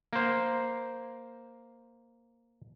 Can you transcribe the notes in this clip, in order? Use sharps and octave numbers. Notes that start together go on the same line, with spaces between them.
A#3 C5